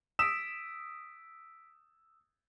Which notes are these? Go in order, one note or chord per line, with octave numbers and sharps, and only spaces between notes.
D#6 E6 B6 D7 E7